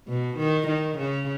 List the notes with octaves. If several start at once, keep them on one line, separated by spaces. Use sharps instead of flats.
B2
D#3
D#3
C#3